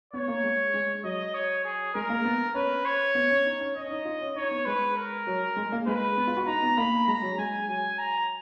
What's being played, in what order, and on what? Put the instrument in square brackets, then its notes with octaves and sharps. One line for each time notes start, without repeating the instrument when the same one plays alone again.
[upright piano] B3 [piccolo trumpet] C#5
[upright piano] A#3
G#3
G#3
[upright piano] F#3 [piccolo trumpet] D#5
[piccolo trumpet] C#5
G#4
[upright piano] G#3 [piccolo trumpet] A#4
[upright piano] A#3
B3
[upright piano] C#4 [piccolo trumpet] B4
[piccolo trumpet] C#5
[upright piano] B3
C#4
D#4
C#4
[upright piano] C#4 [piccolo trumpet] D#5
[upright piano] C#4
D#4
F4
C#4
[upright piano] D#4 [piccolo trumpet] C#5
[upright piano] B3
[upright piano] G#3 [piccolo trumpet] B4
[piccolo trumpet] A#4
[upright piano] F#3
G#3
A#3
[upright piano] G#3 [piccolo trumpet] B4
[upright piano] B3
F4
F#4
[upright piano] D#4 [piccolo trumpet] A#5
[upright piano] B3
[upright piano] A#3 [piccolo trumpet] B5
[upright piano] G#3 [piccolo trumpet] A#5
[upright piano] F#3
[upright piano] G#3 [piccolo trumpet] G#5
[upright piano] F#3 [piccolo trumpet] G#5
[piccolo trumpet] A#5